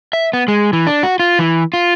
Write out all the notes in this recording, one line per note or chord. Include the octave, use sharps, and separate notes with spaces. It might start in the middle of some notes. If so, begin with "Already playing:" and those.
E5
B3
G#3
E3
D4
F#4
F4
E3
F4